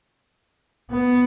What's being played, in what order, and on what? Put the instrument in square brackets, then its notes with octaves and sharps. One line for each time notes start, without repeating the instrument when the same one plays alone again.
[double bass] B3